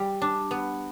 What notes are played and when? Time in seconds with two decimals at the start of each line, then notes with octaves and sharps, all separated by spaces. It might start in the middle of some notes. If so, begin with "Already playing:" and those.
Already playing: G3
0.22 D4
0.51 B3